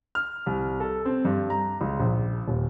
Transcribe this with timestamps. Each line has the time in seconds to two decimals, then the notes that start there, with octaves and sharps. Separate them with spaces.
0.15 F6
0.46 C2
0.80 A4
1.05 C4
1.25 G2
1.50 A#5
1.81 C#2
2.00 A#1
2.48 D#1